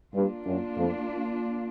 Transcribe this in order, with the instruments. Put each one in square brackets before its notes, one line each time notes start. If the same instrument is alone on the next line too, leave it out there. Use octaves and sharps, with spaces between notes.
[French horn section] G2 [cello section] A#3 D4 F4
[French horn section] F#2
F2